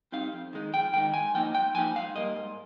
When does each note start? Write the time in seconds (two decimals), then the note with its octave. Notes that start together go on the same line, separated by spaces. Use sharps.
0.12 G3 C4 D#4 F5
0.33 F2
0.53 D#3 G#3 D#4
0.73 F2 G5
0.93 D#3 G#3 D#4 G5
1.14 G#2 G#5
1.34 F3 A#3 D#4 G5
1.54 G#2 G5
1.74 F3 A#3 D#4 G#5
1.95 G#2 F5
2.15 G3 A#3 D#5
2.36 G#2